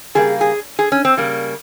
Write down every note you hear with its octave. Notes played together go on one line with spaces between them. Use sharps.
C#3 G3 A#3 G#4
G#4
G#4
C#4
C4
C#3 G3 A#3